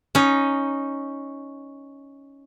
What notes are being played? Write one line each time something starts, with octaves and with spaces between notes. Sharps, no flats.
C#4 D#4